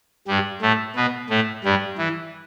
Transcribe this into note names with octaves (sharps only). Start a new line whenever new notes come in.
G2 G3
A2 A3
B2 B3
A2 A3
G2 G3
E3